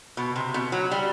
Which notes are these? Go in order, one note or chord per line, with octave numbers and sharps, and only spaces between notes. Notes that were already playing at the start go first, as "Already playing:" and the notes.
B2
C3
B2
F#3
G3